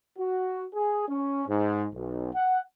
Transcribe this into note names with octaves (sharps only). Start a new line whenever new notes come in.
F#4
G#4
C#4
G#2
B1
F#5